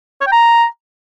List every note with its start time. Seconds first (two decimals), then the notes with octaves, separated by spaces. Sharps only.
0.21 C#5
0.27 G5
0.32 A#5